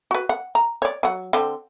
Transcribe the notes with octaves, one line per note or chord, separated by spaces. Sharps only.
F#4 B4
F#5
A#5
C#5 D5
F#3 F#5
D3 C4